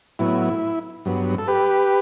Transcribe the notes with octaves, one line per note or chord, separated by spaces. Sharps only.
A2 F#3 B3 E4
G2 F#3 B3
A4
G4 B4